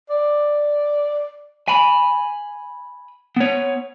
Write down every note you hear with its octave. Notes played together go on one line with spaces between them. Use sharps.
D5
G#5 B5
B3 C#5